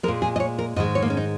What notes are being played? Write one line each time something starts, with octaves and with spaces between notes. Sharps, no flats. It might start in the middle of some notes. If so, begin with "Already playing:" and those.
A#2 G#3 A#4
G#4
D#5
C#5
A#4
G#2 D#3 G#3 D#5
C#5
A#3
C#4
D#4